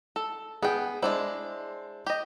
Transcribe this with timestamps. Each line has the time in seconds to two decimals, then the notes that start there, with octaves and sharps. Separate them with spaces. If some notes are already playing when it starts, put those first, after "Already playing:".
0.16 A4
0.63 B3 G#4 G5
1.02 G#3 D4 E4 C5
2.06 G4 D#5